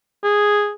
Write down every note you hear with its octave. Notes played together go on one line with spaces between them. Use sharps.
G#4